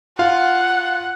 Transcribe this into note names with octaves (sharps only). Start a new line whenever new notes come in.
F4 F5 F#5